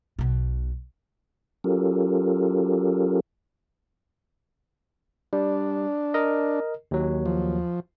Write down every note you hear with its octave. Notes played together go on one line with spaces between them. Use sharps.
B1 B2
F#3 C#4 F4 G4 A4 A#4
G3 D4
A#4 D#5
D#2 F#3
F3